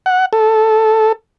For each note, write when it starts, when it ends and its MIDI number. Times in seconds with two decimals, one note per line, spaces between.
0.06 0.26 78
0.33 1.12 69